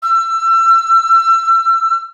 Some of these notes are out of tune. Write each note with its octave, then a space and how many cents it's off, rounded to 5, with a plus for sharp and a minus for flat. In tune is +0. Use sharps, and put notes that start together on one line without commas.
E6 +30